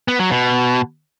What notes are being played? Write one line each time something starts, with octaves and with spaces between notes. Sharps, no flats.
B3
F#3
B2